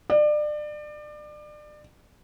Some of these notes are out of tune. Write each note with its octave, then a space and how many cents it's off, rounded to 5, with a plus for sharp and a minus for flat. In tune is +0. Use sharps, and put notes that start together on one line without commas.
D5 +30